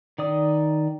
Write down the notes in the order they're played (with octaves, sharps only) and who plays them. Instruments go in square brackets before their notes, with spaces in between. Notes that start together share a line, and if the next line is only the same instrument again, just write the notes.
[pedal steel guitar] D#3 D5 D#6